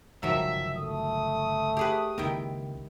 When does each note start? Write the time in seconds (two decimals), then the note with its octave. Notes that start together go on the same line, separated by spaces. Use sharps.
0.23 G1 C#2 D#3 F3 F#3 E5
0.77 A3 D#6
1.77 G4 G#4 B4
2.18 C#2 D#3 A#3 E4 G5